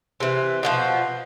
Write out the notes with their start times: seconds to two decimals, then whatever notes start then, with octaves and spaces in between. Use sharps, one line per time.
0.20 C3 E3
0.63 B2 E3 F3